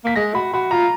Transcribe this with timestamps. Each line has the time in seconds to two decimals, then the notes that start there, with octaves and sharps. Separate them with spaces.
0.04 A#3 B6
0.16 G#3 A#6
0.35 F#4 B5
0.53 F#4 B5
0.71 F4 A#5